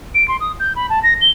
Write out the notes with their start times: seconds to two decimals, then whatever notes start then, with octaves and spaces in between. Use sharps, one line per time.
0.15 D7
0.28 C6
0.40 D#6
0.60 G6
0.76 B5
0.89 A5
1.03 A#6
1.21 G7